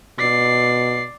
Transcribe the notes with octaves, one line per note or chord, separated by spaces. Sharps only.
B2 D5 C7